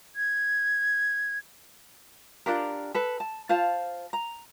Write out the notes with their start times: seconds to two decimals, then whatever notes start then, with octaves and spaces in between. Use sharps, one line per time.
0.16 G#6
2.46 D4 F4 G4 A#4
2.95 A4 B4
3.20 A5
3.49 F4 C5 F5 A5
4.13 A#5